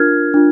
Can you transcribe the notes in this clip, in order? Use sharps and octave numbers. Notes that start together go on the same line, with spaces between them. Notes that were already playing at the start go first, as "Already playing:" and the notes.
Already playing: D4 F4 A#4 F6 G#6
D4 F4